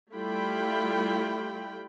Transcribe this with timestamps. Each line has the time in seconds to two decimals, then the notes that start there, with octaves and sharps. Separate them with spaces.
0.14 G3 A3 E4 F4 G5 B5